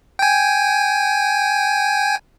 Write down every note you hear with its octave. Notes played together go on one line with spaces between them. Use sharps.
G5 G#5